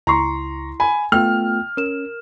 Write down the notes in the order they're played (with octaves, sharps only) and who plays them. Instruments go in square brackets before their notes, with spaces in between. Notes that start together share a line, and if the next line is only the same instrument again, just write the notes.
[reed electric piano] C#2 [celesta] E4 C6 C7 [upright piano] A#5 C#6
[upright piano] G#5 B5
[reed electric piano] A3 B3 F4 [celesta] G5 [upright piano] F6
[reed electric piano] C#4 [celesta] A#4 E7